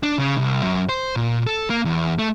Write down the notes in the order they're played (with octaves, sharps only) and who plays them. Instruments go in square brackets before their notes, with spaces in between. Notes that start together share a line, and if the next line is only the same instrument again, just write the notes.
[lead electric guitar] D4
C#3
C2
F#2
C5
A#2
A4
A#3
E2
A3